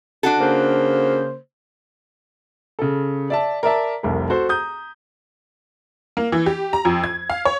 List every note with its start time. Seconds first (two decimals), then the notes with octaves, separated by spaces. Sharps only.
0.23 D4 F#4 A4
0.39 C#3 A#3 C5
2.79 C#3 A4
3.30 D5 E5 A5
3.63 A#4 D5 E5 A5
4.03 F1 C2 A#4
4.30 F#4 A4 C5
4.49 A#5 D#6 G6
6.17 A#3
6.32 E3
6.46 G4
6.73 A#5
6.85 F2
7.04 G#6
7.30 F5
7.45 C#5